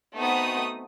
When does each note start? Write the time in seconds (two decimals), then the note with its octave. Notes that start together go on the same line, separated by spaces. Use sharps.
0.17 A3 B3 C4 D#4 F#4 D#6